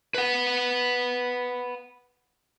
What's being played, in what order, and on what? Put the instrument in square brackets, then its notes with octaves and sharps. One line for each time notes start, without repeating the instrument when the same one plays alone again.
[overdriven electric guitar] B4 F#5